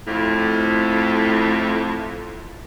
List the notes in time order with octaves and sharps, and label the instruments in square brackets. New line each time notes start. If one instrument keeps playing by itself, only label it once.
[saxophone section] F2 A2